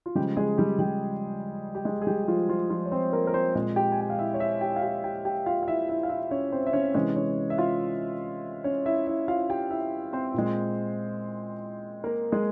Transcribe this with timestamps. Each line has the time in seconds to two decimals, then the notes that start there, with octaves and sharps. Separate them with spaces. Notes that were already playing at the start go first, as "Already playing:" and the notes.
0.06 F4
0.15 C#3 F3 G3 G#3 G4
0.37 G#3 G#4
0.58 G3 G4
0.79 G3 G4
1.75 G4
1.85 G#3 G#4
2.01 G#4
2.07 G3 G4
2.24 G4
2.28 F3 F4
2.49 F3 F4
2.70 F3 F4
2.86 C#5
2.92 C4 C5
3.13 A#3 A#4
3.27 A#4
3.34 C4 C5
3.55 A#2 G#3 C4 C5
3.76 G4 G5
3.92 G#5
4.01 G5
4.10 F5
4.19 E4 E5
4.34 C#5
4.40 E4 E5
4.61 G4 G5
4.76 F5
4.82 G4 G5
5.04 G4 G5
5.25 G4 G5
5.46 F4 F5
5.63 F5
5.68 E4 E5
5.89 E4 E5
6.03 F5
6.10 E4 E5
6.31 C#4 C#5
6.52 C4 C5
6.67 E5
6.73 C#4 C#5
6.94 C3 E3 G#3 C#4 C#5
7.16 C#4 C#5
7.50 E5
7.58 F4 F5
8.64 C#4 C#5
8.86 E4 E5
9.07 E4 E5
9.28 F4 F5
9.50 G4 G5
9.71 E4 E5
10.13 C4 C5
10.34 A#2 G#3
12.04 A#3 A#4
12.32 G#3 G#4